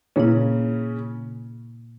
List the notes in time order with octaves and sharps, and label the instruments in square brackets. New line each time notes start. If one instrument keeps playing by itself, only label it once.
[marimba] A#2 A#3 E4 [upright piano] C#3 C#4